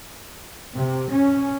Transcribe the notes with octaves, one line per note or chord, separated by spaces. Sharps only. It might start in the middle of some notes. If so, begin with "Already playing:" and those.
C3
C#4